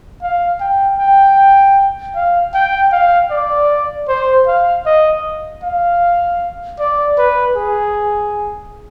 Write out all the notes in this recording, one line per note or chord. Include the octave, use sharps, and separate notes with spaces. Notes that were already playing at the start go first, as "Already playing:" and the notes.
F5
G5
G5
F5
G5
F5
D5
C5
F5
D#5
F5
D5
B4
G#4